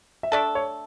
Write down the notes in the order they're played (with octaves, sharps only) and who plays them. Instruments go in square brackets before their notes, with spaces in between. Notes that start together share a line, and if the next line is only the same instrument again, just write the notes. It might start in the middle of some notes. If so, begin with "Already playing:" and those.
[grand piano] E5
[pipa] A3 D4 A4 [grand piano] D5
[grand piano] C#5